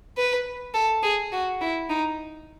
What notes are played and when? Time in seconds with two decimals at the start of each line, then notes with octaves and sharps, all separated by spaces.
0.17 B4
0.74 A4
1.03 G#4
1.32 F#4
1.61 E4
1.90 D#4